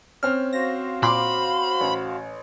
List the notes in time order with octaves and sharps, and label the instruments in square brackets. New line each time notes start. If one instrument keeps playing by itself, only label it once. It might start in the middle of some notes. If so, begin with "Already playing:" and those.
[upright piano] C4 C#4 [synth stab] F6
[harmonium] F#4 C5 F5 [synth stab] A#6
[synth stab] A#2 C6 D6 [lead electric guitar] B5
[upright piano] A1